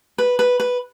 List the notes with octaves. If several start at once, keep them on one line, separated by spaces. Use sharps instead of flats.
B4
B4
B4